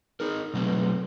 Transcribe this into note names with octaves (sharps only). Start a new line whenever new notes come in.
D#4 G#4 A#4
B2 F#3 A3 C4